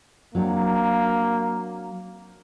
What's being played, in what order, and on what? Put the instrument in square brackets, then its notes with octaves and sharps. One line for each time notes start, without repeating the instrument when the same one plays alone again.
[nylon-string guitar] F#3 C4 D4 [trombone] A#3